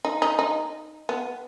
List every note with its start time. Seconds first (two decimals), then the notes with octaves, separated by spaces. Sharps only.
0.05 D#4
0.22 D#4
0.39 D#4
1.09 B3